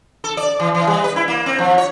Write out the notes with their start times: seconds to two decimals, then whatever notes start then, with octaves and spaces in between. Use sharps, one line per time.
0.24 A4
0.37 D5
0.60 E3
0.75 E3
0.87 G3
1.04 B4
1.16 E4
1.28 A#3
1.46 C4
1.58 F3
1.78 C#5